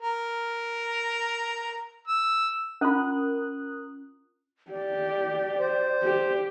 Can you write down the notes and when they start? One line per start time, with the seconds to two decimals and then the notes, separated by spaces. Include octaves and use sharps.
0.01 A#4
2.08 E6
2.81 C#4 F4 A#4 D#6 F#6
4.71 G4 D5
5.59 C5
6.03 G4